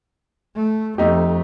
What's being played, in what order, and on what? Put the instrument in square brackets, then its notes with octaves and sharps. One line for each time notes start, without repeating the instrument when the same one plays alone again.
[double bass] A3
[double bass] F2 [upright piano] A3 D#4 G4